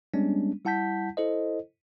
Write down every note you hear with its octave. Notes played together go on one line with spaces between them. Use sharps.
G3 G#3 B3 C#4 D4
G3 E4 F#5 A5 G6 B6
E4 A4 C5 D#5